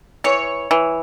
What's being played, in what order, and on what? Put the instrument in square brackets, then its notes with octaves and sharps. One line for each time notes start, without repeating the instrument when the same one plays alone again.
[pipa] E3 [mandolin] C#5
[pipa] E3